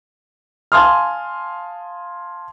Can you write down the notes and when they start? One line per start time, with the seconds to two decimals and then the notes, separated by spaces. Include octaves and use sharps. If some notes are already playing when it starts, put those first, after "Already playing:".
0.72 F5 G#5 A5 C6 D#6 F6